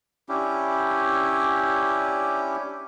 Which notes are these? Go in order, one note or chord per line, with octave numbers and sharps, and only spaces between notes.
C#4 D4 E4 G4